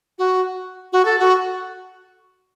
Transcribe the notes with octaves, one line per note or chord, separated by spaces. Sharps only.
F#4
F#4
A4
F#4